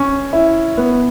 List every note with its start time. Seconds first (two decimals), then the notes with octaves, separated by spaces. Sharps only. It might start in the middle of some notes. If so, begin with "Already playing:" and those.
Already playing: C#4
0.33 E4
0.77 B3